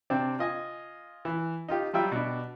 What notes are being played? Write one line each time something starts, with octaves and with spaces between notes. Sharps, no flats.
C3 C4 D4
F4 D#5 G#5
E3
D#4 F4 G4
F#3 G3 F4 E5 G5
B2 D4